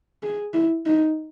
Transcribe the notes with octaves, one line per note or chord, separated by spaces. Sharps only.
G#4
E4
D#4